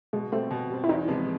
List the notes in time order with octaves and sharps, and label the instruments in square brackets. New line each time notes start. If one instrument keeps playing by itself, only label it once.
[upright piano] B2 [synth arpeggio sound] G#3
[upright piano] G3 C4 [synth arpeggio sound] A3
[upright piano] B2
G3 C4
[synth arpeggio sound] E4
[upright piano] E2 [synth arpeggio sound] D#4
[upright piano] C3 F3 G#3 B3